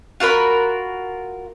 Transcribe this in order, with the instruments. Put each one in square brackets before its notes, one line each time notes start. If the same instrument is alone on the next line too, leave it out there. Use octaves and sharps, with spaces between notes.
[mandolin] F4 F#4 A#4 B5